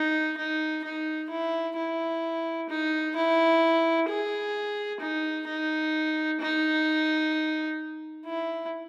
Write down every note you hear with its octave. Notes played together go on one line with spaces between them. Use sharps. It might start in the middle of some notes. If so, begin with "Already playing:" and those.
Already playing: D#4
D#4
D#4
E4
E4
D#4
E4
G#4
D#4
D#4
D#4
E4